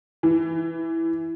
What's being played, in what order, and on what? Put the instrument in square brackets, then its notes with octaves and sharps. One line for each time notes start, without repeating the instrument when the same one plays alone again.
[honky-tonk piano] E3